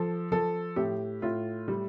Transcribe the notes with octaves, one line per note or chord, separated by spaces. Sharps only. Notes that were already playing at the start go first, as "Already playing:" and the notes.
Already playing: F3 A4
F3 A4
A2 G4
A2 F4
G3